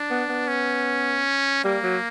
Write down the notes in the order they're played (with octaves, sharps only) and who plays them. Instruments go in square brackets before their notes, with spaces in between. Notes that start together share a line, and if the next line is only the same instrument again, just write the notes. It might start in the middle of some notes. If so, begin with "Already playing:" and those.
Already playing: [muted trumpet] D4
[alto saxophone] B3
B3
[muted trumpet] C#4
[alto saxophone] G3 [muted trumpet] A#3
[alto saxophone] F#3